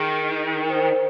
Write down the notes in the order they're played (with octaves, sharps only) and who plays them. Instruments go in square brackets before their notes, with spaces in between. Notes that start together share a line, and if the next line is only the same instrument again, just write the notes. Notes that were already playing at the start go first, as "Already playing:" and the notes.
Already playing: [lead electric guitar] D#3 [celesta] G#4
[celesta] A#4
C5
A#4